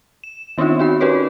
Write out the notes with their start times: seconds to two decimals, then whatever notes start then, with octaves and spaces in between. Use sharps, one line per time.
0.24 E7
0.58 D#3 B3 C4 D4 D#4 F4
0.79 D#4 F#4 B5
1.01 C#4 F#4 G4 A#4 B4 C#5